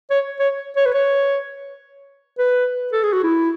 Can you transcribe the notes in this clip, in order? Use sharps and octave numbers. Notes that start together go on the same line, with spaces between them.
C#5
C#5
C#5
B4
C#5
B4
A4
G#4
F#4
E4